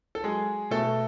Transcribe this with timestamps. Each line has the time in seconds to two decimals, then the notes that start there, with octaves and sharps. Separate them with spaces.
0.15 A4
0.24 F#3 G#3 G#4
0.71 B2 A3 A4